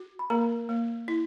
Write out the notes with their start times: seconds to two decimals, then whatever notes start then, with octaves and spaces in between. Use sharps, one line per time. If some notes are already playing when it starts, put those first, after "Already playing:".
Already playing: F#4
0.19 B5
0.30 A#3 A#4 A#5
0.69 A#3
1.08 E4